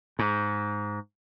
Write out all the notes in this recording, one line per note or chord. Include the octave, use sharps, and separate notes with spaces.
G#2